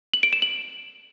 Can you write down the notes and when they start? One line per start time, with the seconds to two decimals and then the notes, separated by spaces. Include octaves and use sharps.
0.14 F#7
0.23 D7
0.33 E7
0.42 F#7